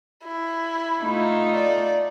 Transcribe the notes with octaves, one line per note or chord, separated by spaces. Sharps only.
E4
A3 D#4 F4
D5